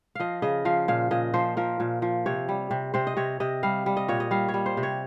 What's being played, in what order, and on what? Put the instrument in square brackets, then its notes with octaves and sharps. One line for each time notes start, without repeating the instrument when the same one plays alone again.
[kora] F3 D#5 F5
C#3 D#5
F3 F5
A#2 F5
A#2 D#5
F3 C5
F3 A#4
A#2
F3
C3 C#5
G3
C3
C3 C5
D#5
C3 C#5
C3 D#5
G3 F5
G3
D#5
A#2 C#5
D#5
G3 F5
C#5
G3
C5
C3
C#5